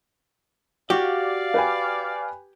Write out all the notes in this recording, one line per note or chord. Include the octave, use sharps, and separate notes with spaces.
F#4 G4 D5 F5
B4 G5 G#5